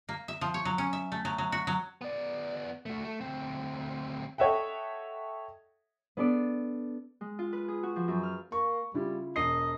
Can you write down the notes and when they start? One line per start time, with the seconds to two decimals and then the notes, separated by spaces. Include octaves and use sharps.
0.09 A#3
0.28 E5
0.41 F3
0.54 C#5
0.65 F#3
0.78 C#4
0.93 E5
1.12 A3
1.25 F#3
1.38 F#3
1.52 F#4
1.67 F#3
2.01 B3 D5
2.86 A3 F#4
3.05 A3
3.21 D2 C4
4.38 A4 C#5 D#5 E5 F#5 G5
6.17 B3 D4 A4 D5
7.21 G#3
7.39 F4
7.53 B4
7.68 G#4
7.83 F#4
7.96 F3
8.08 F#2
8.23 F6
8.52 A#3 C#6
8.94 C#3 G3 E4 F4
9.36 E1 D#5 C7